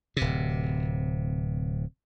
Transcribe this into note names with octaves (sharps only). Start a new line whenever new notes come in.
D1 C3